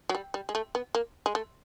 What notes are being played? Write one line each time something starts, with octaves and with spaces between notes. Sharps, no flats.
F#3
G3
G3
G#3
A3
B3
A#3
G#3
A3